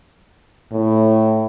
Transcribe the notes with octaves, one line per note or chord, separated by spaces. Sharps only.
A2